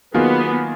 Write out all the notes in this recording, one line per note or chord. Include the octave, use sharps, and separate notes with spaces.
D#3 F#3 A#3 B3 F4 G#4